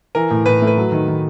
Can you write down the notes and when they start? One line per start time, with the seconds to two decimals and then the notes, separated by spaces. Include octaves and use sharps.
0.15 E3 A#4
0.31 A2
0.46 A2 B4
0.62 A3
0.67 B4
0.78 F#3
0.92 D#3
1.08 D#3